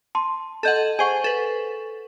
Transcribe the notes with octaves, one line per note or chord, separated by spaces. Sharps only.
A5 C6
A4 D#5 F#5 A5 G6 G#6
G#4 C5 F#5 G#5 C#6
A4 B4